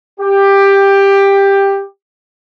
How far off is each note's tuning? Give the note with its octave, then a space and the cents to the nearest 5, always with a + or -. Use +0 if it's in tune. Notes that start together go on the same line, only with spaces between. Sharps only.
G4 +10